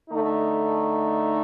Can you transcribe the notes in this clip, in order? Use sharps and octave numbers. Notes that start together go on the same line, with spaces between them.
D3 A3 D#4